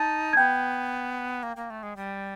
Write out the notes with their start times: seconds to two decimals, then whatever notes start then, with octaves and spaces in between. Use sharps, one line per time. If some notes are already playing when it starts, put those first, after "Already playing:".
Already playing: D#4 A5 A6
0.33 G#6
0.37 B3 G5 G6
1.43 A#3
1.56 A#3
1.70 A3
1.83 G#3
1.96 G3